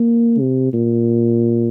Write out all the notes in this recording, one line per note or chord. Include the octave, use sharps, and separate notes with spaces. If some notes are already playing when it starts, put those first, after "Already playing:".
Already playing: A#3
C3
A#2